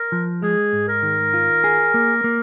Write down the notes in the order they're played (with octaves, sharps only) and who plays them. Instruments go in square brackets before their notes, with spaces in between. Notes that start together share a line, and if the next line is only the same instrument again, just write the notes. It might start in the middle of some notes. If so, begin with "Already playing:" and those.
Already playing: [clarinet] A#4
[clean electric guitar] F3
[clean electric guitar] G#3 [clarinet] G#4
[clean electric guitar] G#2
[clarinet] A#4
[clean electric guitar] D#3
F4
G#4
A#3
A#3